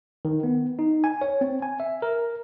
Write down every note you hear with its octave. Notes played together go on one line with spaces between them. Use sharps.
D#3
B3
D#4
G#5
C#5
C4
G#5
E5
A#4